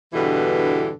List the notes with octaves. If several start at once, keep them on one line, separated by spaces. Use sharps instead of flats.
E2 G2 B2 D3 E3